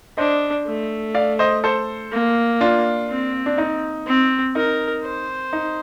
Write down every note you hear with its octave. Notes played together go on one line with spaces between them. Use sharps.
D4 C5 D#5
A3
D5 F5
C5 D#5
A4 C5
A#3
D4 F4
C4
D4
D#4
C4
D#4 A#4
C5
D#4